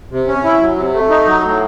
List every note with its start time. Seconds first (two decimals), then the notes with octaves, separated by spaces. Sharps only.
0.11 C3
0.28 C#4
0.44 E4
0.60 F#3
0.77 C3
0.94 A3
1.10 D#4
1.26 F#3
1.42 A2